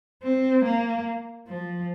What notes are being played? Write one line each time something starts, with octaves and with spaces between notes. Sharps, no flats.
C4
A#3
F3